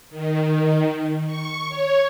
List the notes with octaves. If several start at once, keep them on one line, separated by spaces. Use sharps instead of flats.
D#3
C#6
C#5